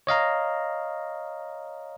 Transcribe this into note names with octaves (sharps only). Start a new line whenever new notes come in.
C#5 D#5 F5 A#5